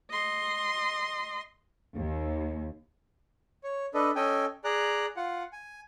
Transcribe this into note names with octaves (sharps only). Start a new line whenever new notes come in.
D#5 C6
D#2
C#5
D4 A4 B4 D#5
C#4 A4 D#5 G5 G#5
G#4 D5 A#5 F#6
F4 F#5
G#5